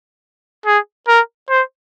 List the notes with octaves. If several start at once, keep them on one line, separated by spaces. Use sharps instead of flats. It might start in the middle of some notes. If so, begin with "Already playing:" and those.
G#4
A#4
C5